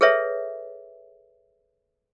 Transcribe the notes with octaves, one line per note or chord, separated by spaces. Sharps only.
G#4 A4 B4 C#5 E5